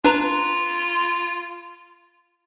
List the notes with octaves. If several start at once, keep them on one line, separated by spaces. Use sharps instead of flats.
D4 F4 B4 A#5